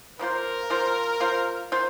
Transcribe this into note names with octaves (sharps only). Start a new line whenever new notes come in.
F3 A#3 F4 A#4 C5
F3 A#3 F4 C5
A#3 F4 C5
A#3 F4 C5